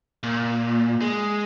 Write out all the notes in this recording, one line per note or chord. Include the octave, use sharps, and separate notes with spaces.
A#2
G#3